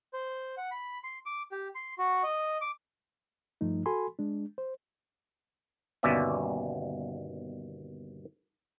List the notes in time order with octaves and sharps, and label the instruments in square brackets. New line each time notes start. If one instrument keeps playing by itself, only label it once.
[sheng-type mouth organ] C5
F#5
B5
C6
D6
G4
C6
F#4
D#5
D6
[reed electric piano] G2 F3 A3 D#4
F#4 A4 G#5 B5 C6
G#3 D4
C5
[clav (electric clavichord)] G1 D#2 B2 C#4 D5 E5